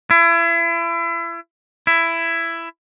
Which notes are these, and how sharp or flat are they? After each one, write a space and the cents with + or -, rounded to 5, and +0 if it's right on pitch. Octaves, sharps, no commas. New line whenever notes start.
E4 +35
E4 +15